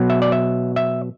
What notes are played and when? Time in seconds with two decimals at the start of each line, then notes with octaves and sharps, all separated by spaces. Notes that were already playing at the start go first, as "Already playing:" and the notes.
Already playing: B2 F#3
0.10 E5
0.22 D5
0.32 E5
0.76 E5